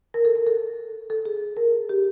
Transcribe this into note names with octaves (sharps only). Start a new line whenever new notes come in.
A#4
A4
A#4
A4
A4
G#4
A#4
G4